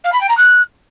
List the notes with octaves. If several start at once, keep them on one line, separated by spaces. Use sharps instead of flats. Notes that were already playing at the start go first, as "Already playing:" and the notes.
F5
B5
G5
A#5
F#6